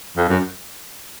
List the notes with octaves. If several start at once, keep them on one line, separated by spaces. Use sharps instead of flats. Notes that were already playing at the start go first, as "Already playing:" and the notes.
F2
F#2